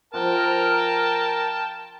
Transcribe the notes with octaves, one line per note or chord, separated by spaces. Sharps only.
F3 A#4 F#5 G5 A5